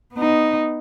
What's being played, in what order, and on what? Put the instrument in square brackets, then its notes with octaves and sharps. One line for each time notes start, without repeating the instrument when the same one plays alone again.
[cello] B3 D#4